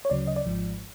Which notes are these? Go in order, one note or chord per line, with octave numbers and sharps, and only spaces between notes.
C#5
D2 C#3 F#3 D5
D#5
D5
G#1 G#2 F3